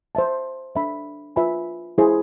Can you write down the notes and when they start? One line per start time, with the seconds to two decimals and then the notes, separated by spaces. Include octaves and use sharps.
0.15 C5 E5 A5
0.75 D4 A4 E5 B5
1.36 F4 B4 E5 G#5 B5
1.98 E4 G#4 C5